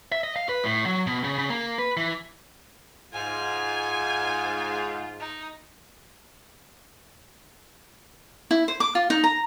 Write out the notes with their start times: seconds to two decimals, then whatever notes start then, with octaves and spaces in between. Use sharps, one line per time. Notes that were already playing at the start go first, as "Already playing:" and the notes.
0.12 E5
0.23 D#5
0.36 F5
0.49 B4
0.64 A2
0.86 F#3
1.07 B2
1.24 C#3
1.38 C#3
1.50 A#3
1.78 B4
1.97 E3
3.13 G#2 F4 G#5
5.21 D#4
8.51 E4
8.68 C5
8.80 D6
8.95 F4
9.10 D#4
9.24 A#5